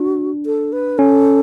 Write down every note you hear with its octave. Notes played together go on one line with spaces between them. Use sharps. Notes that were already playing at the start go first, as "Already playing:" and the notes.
Already playing: D4 F#4
A4
B4
C#4 A4